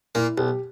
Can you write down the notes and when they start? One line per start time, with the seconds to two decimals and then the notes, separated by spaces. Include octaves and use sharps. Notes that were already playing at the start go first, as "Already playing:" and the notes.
0.15 A#2 A#3 E4
0.37 B1 G4